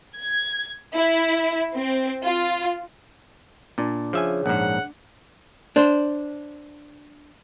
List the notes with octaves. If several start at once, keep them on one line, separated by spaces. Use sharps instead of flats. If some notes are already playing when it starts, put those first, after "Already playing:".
G#6
E4
C4
F4
A#2 D4
C#3 F3 E5 G#5
A#1 G#2 F#5
D4 C5